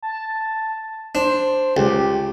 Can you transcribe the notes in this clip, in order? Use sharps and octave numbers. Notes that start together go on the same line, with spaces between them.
A5
D4 C5
C#2 G4